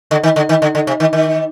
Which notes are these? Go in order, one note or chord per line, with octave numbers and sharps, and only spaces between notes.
D3
D#3
D3
D#3
D3
D3
C3
D#3
D#3